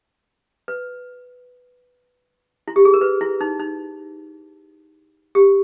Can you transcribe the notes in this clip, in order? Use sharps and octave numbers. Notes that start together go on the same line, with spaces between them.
B4
E4
G4
G#4
A#4
B4
E4
D#4
D#4
G4